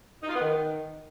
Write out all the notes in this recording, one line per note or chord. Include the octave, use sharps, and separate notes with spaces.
D#4
F4
B3
D#3